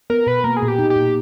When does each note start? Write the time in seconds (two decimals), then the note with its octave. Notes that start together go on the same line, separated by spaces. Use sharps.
0.10 B3 A#4
0.27 B2 B4
0.44 A#3 A#4
0.57 G#4
0.62 A#2
0.68 G4
0.79 D#4
0.90 G4
0.96 A#2